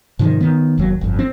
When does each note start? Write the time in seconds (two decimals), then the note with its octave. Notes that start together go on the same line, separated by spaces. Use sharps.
0.19 G#2 C3 D#3 F3
0.41 D#3 B3
0.78 F1 D#2 F#3
1.01 G1 F2
1.19 C4